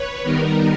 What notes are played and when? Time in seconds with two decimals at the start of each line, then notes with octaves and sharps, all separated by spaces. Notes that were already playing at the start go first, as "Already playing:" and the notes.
Already playing: B4 C#5
0.24 D#3 G3 B3 D#4 A#4